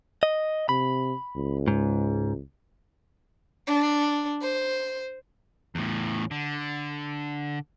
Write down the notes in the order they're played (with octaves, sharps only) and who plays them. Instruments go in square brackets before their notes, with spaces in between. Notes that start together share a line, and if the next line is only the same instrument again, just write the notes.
[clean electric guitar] D#5
[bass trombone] C3 [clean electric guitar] B5
[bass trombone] C#2
[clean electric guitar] G#2
[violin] D4
C5
[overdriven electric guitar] E2 A2
D3